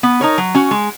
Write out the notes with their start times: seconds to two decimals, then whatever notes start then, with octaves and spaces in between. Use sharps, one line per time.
0.03 B3
0.21 D#4 A#4 C#5
0.38 F#3
0.55 C#4 F#4
0.71 G#3